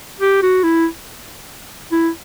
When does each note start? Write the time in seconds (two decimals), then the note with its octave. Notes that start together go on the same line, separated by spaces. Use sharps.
0.20 G4
0.42 F#4
0.64 E4
1.92 E4